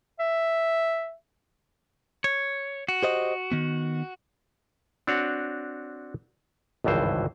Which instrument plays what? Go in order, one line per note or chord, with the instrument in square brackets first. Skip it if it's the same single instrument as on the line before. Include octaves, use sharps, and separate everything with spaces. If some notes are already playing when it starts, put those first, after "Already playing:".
[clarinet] E5
[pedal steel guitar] C#5
F#4
[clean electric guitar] G4 C5 D#5
D#3 B3
[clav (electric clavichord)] C4 D4 F#4 C#5 F#5
G#1 C#2 G2 E3 C5